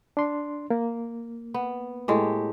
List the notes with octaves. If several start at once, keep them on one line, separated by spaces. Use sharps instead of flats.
D4 C6
A#3
B3
A2 G#3 G4